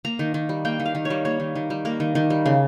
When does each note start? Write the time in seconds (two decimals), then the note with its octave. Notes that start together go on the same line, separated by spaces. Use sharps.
0.05 A#3 A#5
0.19 D#3
0.34 D#3
0.49 G3
0.65 A#3 G5
0.80 D#3
0.86 F5
0.95 D#3
1.05 C#5
1.10 G3
1.25 A#3 C#5
1.40 D#3
1.56 D#3
1.70 G3
1.85 A#3 A#4
2.00 D#3
2.15 D#3
2.30 G3
2.46 C#3